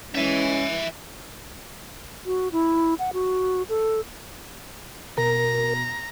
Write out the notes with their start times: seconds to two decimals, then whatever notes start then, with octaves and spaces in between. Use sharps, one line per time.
0.15 E3 G#3 C#4 E5 G#5
2.26 F#4
2.52 E4
2.99 F#5
3.13 F#4
3.69 A4
5.18 B2 A#4 A#5